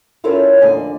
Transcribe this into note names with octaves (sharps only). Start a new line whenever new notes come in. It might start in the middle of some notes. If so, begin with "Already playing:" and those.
C#4 E4 F4 A4 A#4 C#5
F2 D3 A#3 D5 D#5 G#5